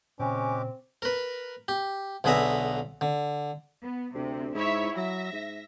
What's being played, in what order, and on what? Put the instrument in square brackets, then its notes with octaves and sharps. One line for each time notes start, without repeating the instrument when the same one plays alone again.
[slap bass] A#2 C#3 [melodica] G#3 G4 D6 [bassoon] C4 [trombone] C#4
[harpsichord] A#4 B4
G4
B1 D3 G#4 B4 E5 A#5
D3
[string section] B3
[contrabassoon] D2 [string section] C3
[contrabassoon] G#2 [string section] E4 C#5 E5
[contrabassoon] F#3 [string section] E5 A#6
[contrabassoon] G#2